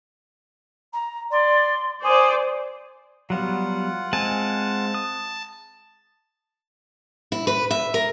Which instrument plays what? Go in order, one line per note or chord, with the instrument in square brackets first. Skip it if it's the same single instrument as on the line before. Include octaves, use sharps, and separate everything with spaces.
[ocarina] A#5
[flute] D5 [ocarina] C6
[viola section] C5 D5 [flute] G#5 [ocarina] D#6
[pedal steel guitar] F#3 G3 B3 [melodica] F4 F#5
[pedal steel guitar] G#3 C4 G#5 [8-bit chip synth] A5
[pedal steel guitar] D#6
[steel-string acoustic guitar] E4
B4
E5
A#4